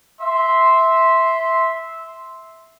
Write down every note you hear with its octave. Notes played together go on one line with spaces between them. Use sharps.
E5 C6